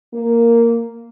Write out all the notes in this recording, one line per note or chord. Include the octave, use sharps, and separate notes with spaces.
A#3